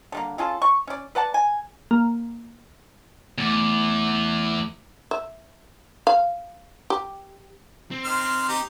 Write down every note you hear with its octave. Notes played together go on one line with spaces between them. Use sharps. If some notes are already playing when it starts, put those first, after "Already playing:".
D3 G3 A#3
C#4 F4 G#4 A4
C#6
C#4 D5
B4 D5 F#5 A5
G#5
A#3
E2 A3 D6
E5
F5
G4
C4
D#3 C6 F6
D#4 G4 A#5